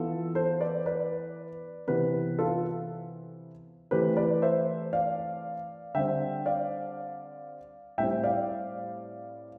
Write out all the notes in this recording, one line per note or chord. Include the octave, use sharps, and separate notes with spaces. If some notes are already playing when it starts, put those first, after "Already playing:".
Already playing: E3 B3 F4 A4
A4 C5
B4 D5
B4 D5
C3 E3 B3 G4 B4
F4 A4
E3 A3 C4 G4 B4
B4 D5
C5 E5
D5 F5
D3 G3 C4 E5 G5
D5 F5
A2 G3 C4 E5 G5
D5 F5